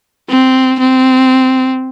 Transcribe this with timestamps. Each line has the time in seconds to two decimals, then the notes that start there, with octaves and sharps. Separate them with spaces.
0.29 C4
0.80 C4